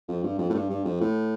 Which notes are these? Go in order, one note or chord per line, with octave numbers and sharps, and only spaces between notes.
F2
G2
F2
A2
G2
G2
F2
A2